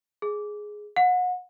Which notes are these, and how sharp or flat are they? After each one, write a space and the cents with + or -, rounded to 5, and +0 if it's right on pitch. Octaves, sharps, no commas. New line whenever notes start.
G#4 +5
F#5 -30